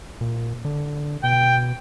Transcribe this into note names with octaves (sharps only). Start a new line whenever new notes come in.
A#2
D3
B2 G5